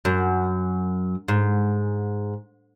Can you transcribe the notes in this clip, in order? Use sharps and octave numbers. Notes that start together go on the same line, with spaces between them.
F#2
G#2